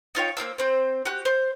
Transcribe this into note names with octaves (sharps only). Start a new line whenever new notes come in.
D#4 F4 C#5 G5
A#3 E4 C5 E6
C4 C5
F#4 G4 F#6
C5